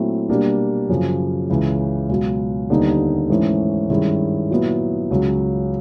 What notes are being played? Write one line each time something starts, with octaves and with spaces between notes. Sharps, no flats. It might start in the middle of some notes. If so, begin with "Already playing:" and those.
Already playing: A#2 F#3 A3 C4 E4
B2 G3 A#3 D4
F#2 C#3 F3
C#2 C#3 E3
C#2 B2 F#3
D#2 D3 G3 B3 D#4
G#2 E3 A3 C#4 E4
G2 D#3 G#3 C#4 E4
A#2 F#3 B3 E4
C#2 C#3 F#3